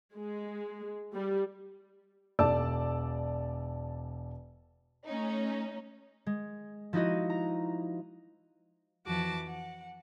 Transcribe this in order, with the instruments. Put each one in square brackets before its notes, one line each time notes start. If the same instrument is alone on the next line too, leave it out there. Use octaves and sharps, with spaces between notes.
[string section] G#3
G3
[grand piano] E1 D5 A5 E6
[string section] A3 C#4 D#4
[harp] G#3
F3 D#4 E4 F#4 D#5
A#5
[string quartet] F2 E3 F3 F#4 A5 D6
F#5